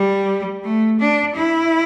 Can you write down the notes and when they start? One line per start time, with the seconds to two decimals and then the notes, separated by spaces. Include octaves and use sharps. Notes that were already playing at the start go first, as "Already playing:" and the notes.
Already playing: G3
0.64 A3
0.99 D4
1.36 E4